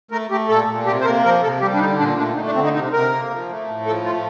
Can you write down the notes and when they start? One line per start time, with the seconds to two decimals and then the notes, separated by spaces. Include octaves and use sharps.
0.11 A3 A#4
0.31 A3 G4
0.49 A#2 A4
0.67 A#2
0.86 C3 G4
1.01 C5
1.05 A#3 A#4
1.23 F3 A#4
1.42 C3 A4
1.61 G3 G4
1.74 D4
1.80 D3 D#4
1.98 A#2 D4
2.17 A3 D4
2.36 A3 D#4
2.46 D4
2.55 D3 C4
2.64 D#4
2.74 C3 D#4
2.93 C3 A#4
3.11 A#3
3.31 F3
3.49 A3
3.68 A2
3.86 F3 A4
4.05 A3 F4